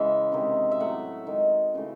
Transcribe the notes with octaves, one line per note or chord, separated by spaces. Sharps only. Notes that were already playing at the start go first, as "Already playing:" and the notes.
Already playing: C#3 E3 G#3 E5
C3 D#3 G#3
E5
A2 F#3 A3 F#5
D#3 G#3
C#3 E3 A3